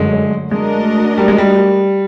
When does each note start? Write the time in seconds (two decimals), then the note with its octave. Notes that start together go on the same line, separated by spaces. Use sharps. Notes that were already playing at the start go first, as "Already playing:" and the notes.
Already playing: F#2 D3 F#3 G#3 A3
0.51 G#3 A3 D4 F#4 A#4 D#5
1.18 G3
1.28 G#3
1.38 G3